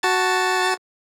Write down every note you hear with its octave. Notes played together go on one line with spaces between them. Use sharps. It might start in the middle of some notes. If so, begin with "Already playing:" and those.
F#4 A5 A6